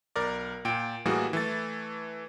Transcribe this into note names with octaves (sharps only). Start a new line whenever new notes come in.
B1 A#4 D5
A#2 G5 D7
A2 E3 G3 A#3 F#4 G#4
E3 A3 A6